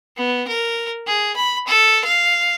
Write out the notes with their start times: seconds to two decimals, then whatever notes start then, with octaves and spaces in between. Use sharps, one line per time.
0.17 B3
0.48 A#4
1.07 G#4
1.36 B5
1.68 A4
2.05 F5